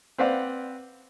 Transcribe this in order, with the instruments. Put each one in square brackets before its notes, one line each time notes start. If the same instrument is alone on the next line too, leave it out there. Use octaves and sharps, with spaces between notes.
[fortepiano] C4 B4 C5 D5 F5 F#5